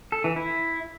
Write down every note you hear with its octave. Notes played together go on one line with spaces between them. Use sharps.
A4
E3
E4